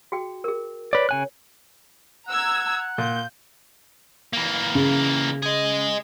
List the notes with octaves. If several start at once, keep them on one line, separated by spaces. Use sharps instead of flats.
F#4 G#4 G5
G#4 A#4
B4 C#5 D5
C#3 G#5 F#6
F#5 A#5 E6 G#6
A#2 G6
E3 A#3
C#3
G#4 D#5